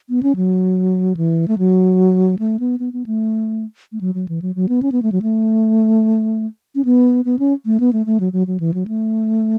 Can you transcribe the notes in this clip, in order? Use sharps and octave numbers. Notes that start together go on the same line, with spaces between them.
B3
C#4
F#3
E3
A3
F#3
A3
B3
B3
B3
A3
A3
F#3
F#3
E3
F#3
F#3
B3
C#4
B3
A3
F#3
A3
C#4
B3
B3
C#4
A3
B3
A3
A3
F#3
F#3
F#3
E3
F#3
A3